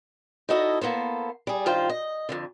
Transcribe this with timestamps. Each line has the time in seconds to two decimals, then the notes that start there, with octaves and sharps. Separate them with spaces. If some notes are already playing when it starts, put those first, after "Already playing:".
0.49 D#4 E4 F#4 A4 D#5
0.81 A#3 B3 A4 C5
1.47 G3 G#4
1.66 G2 D#3 F4 C5 G5
1.89 D#5
2.29 F2 G#2 D3